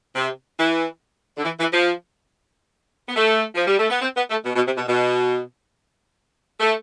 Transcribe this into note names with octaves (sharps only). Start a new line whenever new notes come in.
C3
E3
D3
E3
E3
F3
B3
A3
F3
G3
A3
B3
C4
B3
A3
B2
B2
C3
B2
B2
A3